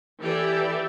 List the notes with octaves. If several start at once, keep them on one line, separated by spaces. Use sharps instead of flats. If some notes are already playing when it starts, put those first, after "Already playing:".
E3 G4 A4 D5 E5